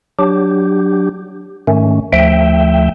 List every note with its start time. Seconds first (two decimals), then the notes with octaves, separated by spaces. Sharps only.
0.19 F#3 D4 G4
1.67 G#2 D#3 A3 C#4
2.13 D2 F3 A3 E5 G5